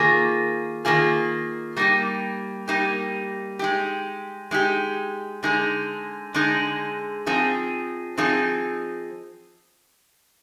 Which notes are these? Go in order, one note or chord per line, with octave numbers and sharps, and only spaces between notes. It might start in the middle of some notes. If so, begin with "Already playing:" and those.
Already playing: D#3 A#3 F4 G#4
D#3 A#3 F4 G#4
G3 A#3 D#4 G4
G3 A#3 D#4 G4
G#3 D#4 G4
G#3 D#4 G4
D3 G#3 D#4 G#4
D3 G#3 D#4 G#4
F3 C4 D#4 G#4
F3 C4 D#4 G#4